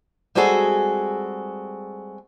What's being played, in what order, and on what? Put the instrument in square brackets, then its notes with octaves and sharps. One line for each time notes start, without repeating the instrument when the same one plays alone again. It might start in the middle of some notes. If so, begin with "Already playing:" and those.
[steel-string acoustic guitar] G3 G#3 C4 F#4 G#4 A4